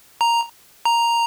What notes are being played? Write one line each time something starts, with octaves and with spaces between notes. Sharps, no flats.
A#5
A#5